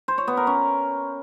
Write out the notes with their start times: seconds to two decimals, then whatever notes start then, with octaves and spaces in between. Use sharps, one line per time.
0.08 C5
0.18 C#5
0.28 B3
0.37 A#4
0.47 C#4